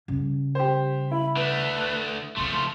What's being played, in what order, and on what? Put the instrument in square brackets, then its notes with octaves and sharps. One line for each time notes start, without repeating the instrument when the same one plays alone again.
[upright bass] C#3 G3
[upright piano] G4 C5
[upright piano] E4 [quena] B5
[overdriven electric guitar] D3 A3 [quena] B4
[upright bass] C#3 C4 [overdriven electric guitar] F3 A3 [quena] C6